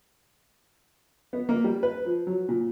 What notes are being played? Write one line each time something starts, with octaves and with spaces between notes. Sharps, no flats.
B3
A#3
G3
B4
F3
F#3
A#2